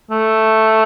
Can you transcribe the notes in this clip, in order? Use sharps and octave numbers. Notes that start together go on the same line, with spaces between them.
A3